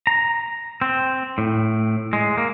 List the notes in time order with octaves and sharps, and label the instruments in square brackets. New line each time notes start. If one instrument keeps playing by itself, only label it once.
[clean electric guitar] A#5
C4
A2
G#3
A#3